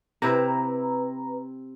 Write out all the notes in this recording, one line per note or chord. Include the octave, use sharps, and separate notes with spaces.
C3 C4 E4 B4 A#5